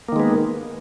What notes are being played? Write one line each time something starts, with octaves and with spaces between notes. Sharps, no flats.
D#3 G#3 A#3 B3